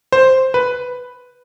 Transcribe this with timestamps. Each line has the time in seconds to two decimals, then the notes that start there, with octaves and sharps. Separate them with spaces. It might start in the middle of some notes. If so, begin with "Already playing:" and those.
0.12 C5
0.54 B4